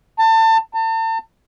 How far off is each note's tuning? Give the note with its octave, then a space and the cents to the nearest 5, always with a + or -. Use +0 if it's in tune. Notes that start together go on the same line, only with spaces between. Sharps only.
A5 +30
A5 +40